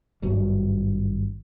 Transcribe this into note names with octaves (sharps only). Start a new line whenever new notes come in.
G#1 G2 F#3 G3